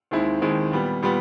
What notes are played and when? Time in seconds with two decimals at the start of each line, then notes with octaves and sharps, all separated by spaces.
0.11 D#2 D#3 G#3 C4 E4
0.41 D#2 D#3 G#3 C4 E4
0.71 A#2 G3 B3
1.02 A#2 G3 B3